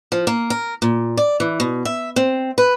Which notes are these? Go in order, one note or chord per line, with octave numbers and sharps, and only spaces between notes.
F3
A#3
A#4
A#2
D5
E3
B2
E5
C4
B4